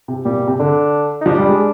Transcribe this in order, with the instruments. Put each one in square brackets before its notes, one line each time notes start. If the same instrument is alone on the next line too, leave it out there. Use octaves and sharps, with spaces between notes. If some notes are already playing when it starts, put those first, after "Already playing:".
[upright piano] C3
[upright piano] A#2 [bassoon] G3
[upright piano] C3
C3
[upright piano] D3 [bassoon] D4
[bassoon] D#4
[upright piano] F3 [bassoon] D4
[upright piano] G3
G#3